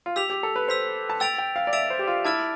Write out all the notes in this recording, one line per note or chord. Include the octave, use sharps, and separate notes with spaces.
F4
G4 E6 B6 F7
G4
A4
B4
C5 E6 B6 F7
A5
G5 E6 A6 D7 F7
G5
F5
D5
E5 E6 A6 D7 F7
C5
G4
F4
E4 A5 D6 F6 A6